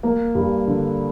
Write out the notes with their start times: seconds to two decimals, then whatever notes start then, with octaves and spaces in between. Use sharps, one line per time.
0.03 A#3
0.35 G2
0.67 D3